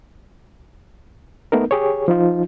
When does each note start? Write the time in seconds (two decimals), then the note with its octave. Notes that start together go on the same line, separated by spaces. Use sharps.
1.52 A3 B3 D#4 A#4
1.71 G4 G#4 C#5
2.08 F3 D#4 F4